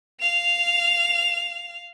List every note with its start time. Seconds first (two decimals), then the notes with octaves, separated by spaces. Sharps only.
0.20 F5 F7